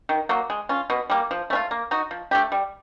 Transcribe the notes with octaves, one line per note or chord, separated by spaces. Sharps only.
D#3
F#3 A#3
G#3
C#4 F4
B2
G3 A#3
F3
A3 C#4 F4
A#3
D#4 F#4
F3
A3 D4 G4
G3